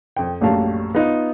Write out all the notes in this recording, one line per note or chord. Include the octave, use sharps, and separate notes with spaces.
F2 G5
A#1 F#2 A2 G3 F5 A5
B3 D#4 F4